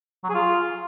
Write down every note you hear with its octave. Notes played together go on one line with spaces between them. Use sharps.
F#3
G#4
F4